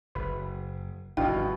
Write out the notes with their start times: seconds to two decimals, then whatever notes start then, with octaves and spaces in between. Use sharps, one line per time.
0.15 F#1 B4
1.17 G1 F2 G#2 B2 D4 E4 F5 G5